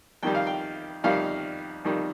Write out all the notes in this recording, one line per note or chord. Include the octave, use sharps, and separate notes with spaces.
F2 D#3 G3 G5
F5
G5
F2 D#3 G3 F5
F2 D#3 G3